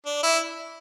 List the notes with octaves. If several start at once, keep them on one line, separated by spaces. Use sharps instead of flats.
D4
E4